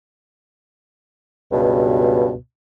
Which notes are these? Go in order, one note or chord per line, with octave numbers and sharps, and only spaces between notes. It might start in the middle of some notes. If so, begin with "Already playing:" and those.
C#2 G2 B2